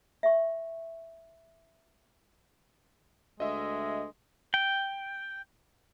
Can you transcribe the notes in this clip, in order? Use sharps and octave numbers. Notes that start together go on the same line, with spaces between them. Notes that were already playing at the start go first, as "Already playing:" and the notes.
E5 C#6
D2 G#3 D#5 E5
G5